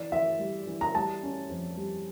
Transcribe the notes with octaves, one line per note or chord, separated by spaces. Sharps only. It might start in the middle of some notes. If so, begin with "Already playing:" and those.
Already playing: E3 D5
E3 E5
G3
E3
A#5
G3 A5
C#4
F2
G3